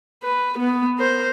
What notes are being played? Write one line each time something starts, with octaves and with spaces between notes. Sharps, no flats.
B4
B3
A#4 C5